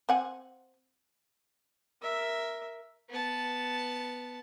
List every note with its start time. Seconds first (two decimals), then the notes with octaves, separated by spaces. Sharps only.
0.09 C4 F#5 G#5
2.02 A#4 E5
3.10 B3 A5